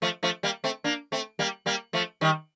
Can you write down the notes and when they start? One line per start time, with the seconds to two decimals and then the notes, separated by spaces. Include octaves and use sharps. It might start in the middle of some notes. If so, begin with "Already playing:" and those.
0.02 F3 A3
0.23 F3 A3
0.43 G3 A#3
0.64 A3 C4
0.84 A#3 D4
1.12 A3 C4
1.39 G3 A#3
1.66 G3 A#3
1.93 F3 A3
2.21 D#3 G3